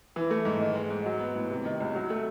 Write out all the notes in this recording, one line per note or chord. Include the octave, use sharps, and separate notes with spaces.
E3
A3
G#2
D#3
G#3
G#2
F#3
B3
A2
C3
D#3
C#2
F#3
A3